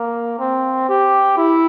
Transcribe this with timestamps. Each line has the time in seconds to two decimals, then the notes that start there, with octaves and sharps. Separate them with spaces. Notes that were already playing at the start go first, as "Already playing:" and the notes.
Already playing: A#3
0.39 C4
0.89 G4
1.37 E4